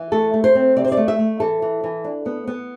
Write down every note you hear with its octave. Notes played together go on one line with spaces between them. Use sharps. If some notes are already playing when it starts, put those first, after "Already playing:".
Already playing: E3
A3 A4
A3
C5
C4
C3 D5
C5
D5
A3
E5
A3
E3 A4
E3
E3
D4
B3
B3